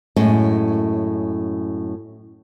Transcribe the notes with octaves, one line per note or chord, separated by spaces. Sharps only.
F#2 A2 G#3 C#4